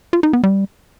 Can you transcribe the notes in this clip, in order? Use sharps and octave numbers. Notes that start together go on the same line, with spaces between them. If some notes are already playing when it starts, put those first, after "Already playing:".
F4
D#4
B3
G3